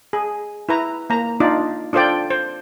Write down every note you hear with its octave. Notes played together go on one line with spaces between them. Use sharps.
G#4
E4 B4 A#5
A#3 A#5
D4 D#4 F4 D5
D4 F4 A4 C5 D5 G5
C5